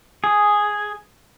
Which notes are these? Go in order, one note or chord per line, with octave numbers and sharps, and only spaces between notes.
G#4